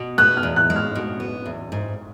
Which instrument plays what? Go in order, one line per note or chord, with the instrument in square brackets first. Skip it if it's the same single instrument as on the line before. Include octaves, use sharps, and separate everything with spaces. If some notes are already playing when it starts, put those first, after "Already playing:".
Already playing: [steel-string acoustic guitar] B2
[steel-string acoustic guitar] B3 [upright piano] F#6
[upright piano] F6
[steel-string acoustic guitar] E2
[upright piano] F#6
[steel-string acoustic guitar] G#3
[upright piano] F6
[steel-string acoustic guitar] B2
B3
E2
G#2